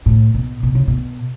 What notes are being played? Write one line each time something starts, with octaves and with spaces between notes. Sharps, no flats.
A2
B2
B2
C#3
B2